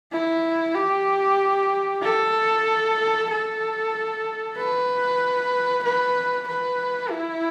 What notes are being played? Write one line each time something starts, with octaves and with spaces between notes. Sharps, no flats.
E4
G4
A4
A4
B4
B4
B4
E4